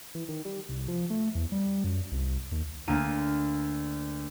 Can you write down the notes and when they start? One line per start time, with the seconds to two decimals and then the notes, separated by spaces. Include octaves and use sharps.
0.15 E3
0.29 D#3
0.45 G3
0.69 C2
0.88 F3
1.10 A3
1.35 E2
1.52 G3
1.84 F#2
2.12 C2
2.52 D#2
2.88 D2 A#3 D#7